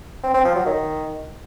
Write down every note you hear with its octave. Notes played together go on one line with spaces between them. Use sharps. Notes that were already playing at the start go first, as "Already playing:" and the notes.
C4
C4
F3
F#3
D#3